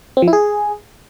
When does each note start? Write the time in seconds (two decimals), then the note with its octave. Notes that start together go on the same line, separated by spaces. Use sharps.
0.17 C4
0.22 F3
0.28 E4
0.33 G#4